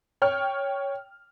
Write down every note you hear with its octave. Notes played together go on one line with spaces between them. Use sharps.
C#5 G5 F6